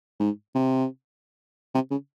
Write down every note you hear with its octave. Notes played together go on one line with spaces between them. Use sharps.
G#2
C3
C3
C#3